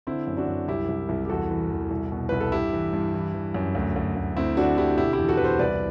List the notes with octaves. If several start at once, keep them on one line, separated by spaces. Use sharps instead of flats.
D3 C4 E4
F#2
D4 F#4
F#2
C2 E4 G4
C2
C2
G4
E2 F#4 A4
E3
E2
C2
B2
C2 B4
A4
G2 E4 G4
E3
G2
E3
E3
F#2
D2
D2
D2
D2 C4 E4
D3 D4 F#4
D3 E4 G4
B2 E4 G4
E4 G4
E2
F#4 A4
E2 B4
A4 C5
C2 B4 D5